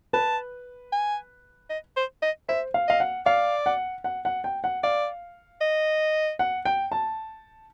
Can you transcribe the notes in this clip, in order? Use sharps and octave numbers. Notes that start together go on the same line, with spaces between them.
B4 A5
G#5
D#5
C5
D#5
C5 E5
F5
D#5 F5
F#5
D5 F5
F#5
F#5
F#5
G5
F#5
D5 F5
D#5
F#5
G5
A5